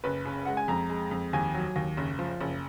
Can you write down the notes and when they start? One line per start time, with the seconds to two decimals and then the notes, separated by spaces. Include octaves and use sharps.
0.04 F#1 B4
0.25 C#3
0.45 G#3 F#5
0.57 G#5
0.68 F2 A#5
0.89 G#3
1.11 F2
1.33 D#2 G#5
1.54 F#3
1.76 D#2
1.97 F#1
2.19 F3
2.41 F#1